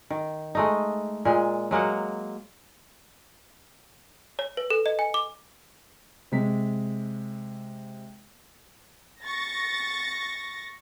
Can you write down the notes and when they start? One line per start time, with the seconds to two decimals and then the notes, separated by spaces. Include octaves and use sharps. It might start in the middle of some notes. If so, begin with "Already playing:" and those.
0.10 D#3
0.55 G#3 A3 D#4
1.25 A#2 G#3
1.71 F#3 G#3 A#3 F#5
4.39 C#5
4.57 B4
4.70 A4
4.86 D#5
4.99 G#5
5.14 D6
6.32 C3 G#3 B6
9.22 C#6 A6 A#6